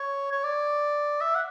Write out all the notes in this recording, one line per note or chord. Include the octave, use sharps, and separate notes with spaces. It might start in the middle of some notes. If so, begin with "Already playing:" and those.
Already playing: C#5
C#5
D5
E5
F#5